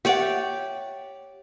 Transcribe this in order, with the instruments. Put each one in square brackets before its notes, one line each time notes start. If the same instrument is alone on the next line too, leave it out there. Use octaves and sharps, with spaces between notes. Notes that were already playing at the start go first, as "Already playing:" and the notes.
[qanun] G4 C#5 D5 [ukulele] E5 F#5